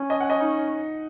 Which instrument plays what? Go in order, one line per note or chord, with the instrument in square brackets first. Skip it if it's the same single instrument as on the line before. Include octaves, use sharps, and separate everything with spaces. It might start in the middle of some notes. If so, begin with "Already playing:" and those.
Already playing: [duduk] C#4
[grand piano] D#5
F#5
D#5
D#4